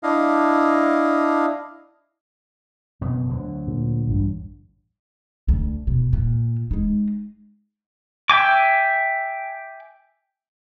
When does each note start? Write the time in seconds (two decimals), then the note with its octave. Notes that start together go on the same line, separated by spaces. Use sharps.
0.03 D4 E4 D#5 F5
3.01 F#1 B2 B3
3.30 D2 D3 F#3
3.67 A#2
4.08 A1 G2
5.48 D2
5.87 B2
6.13 A#2
6.71 G#3 D#4
8.30 E5 G5 G#5 D6